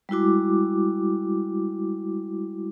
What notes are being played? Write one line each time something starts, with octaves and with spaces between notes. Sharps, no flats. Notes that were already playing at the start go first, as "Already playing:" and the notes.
G3 G#3 E4 F#4 D6